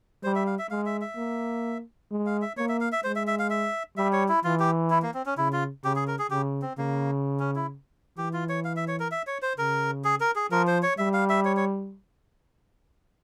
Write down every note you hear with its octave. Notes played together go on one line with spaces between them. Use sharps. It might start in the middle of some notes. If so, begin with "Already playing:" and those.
G3 C5
E5
F5
E5
G#3 F5
E5
E5
A#3
G#3
F5
E5
A#3 C#5
E5
F5
E5
G#3 C5
E5
E5
F5
E5
G3 E5
C#5
E4
E3 F4
G4
E4
A#3
C4
C#4
C#3 E4
F4
C#3 G4
G#4
A#4
G#4
C#3 G4
C4
C#3 A#3
C#4
E4
E3 G4
F4
C#5
F5
E5
C#5
A#4
E5
C#5
C5
C#3 A#4
G#4
A#4
G#4
F3 A#4
C5
C#5
G3 E5
F5
E5
C#5
C#5